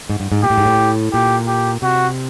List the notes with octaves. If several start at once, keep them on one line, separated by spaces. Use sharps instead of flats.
G#2
G2
G#2
A#2 G4
A2
G#2
A2
A#2 G4
G4
C3 F#4